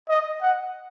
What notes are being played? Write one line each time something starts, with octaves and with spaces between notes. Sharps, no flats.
D#5
F#5